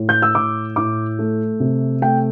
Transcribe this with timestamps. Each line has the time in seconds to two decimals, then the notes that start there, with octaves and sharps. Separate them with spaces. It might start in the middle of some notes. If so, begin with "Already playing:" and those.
Already playing: A2
0.09 G6
0.22 E6
0.35 A2 D6
0.76 A2 D6
1.19 A3
1.60 C3
2.02 A3 G5